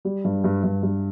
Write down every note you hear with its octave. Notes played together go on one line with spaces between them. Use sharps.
G3
G2
G2
G2
G2